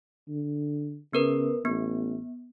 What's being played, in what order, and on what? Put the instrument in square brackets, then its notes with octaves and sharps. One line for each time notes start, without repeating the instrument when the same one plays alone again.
[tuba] D3
[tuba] C#3 [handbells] B3 A#4 B4
[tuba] A1 [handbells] B3